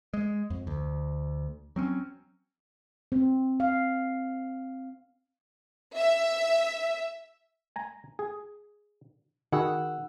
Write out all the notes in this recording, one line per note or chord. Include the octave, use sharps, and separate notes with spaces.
G#3
F2
D2
F#3 C4 C#4
C4
F5
E5
G#5 A#5
G#4
D#3 F#4 G#4 F#5 B5 E6